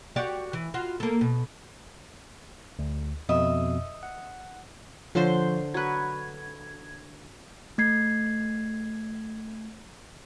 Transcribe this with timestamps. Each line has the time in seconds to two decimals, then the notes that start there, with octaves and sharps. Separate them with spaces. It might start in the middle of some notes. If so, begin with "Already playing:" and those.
0.16 F#4 G4 D5
0.53 E3
0.74 F4 F#4
1.00 A#3 A4
1.21 B2
2.79 D2
3.29 F2 B2 D#5 E5
4.03 F#5
5.15 D3 F3 F4 C5 C#5 C6
5.74 F#3 B4 G#6
7.78 A3 G#6 C7